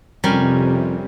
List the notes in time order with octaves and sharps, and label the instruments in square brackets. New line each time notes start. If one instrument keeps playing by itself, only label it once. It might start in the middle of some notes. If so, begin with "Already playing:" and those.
[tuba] F2 [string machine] C3 [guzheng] G3 C#4 A#4